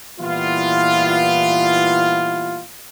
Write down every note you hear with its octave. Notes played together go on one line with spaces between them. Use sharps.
A#2 E3 G3 B3 E4 F4